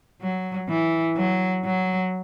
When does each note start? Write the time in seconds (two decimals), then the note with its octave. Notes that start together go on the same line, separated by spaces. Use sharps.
0.21 F#3
0.69 E3
1.16 F#3
1.65 F#3